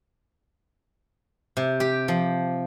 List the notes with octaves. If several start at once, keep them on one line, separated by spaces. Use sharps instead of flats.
C3
G4
F3